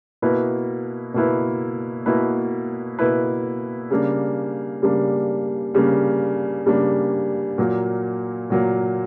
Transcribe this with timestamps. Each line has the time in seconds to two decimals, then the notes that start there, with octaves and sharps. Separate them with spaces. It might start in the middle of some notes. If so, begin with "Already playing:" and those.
0.22 B2 A#3 E4 B4
1.14 B2 A#3 E4 B4
2.06 B2 A#3 E4 B4
2.99 B2 A#3 E4 B4
3.90 C#3 G3 A#3 D4
4.82 C#3 G3 A#3 D4
5.74 C#3 G3 A#3 D4
6.66 C#3 G3 A#3 D4
7.58 A#2 F#3 A#3
8.50 A#2 F#3 A#3